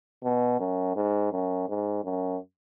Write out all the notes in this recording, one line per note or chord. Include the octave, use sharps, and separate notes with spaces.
B2
F#2
G#2
F#2
G#2
F#2